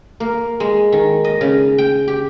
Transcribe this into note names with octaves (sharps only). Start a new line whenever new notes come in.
A#3
G#3
D#3
D#5
C#3
G5
G4